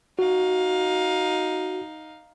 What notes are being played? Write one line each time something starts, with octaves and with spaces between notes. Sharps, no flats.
D#4 F#4 F5